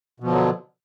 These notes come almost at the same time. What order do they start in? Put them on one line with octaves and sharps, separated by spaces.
B2 F3 D3 F#3